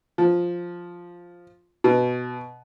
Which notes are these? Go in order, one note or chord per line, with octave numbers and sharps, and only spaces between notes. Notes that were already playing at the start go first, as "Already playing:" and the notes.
F3
B2